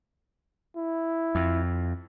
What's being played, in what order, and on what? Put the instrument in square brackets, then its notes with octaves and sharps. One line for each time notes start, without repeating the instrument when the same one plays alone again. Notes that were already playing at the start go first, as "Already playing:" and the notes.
[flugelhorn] E4
[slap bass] F2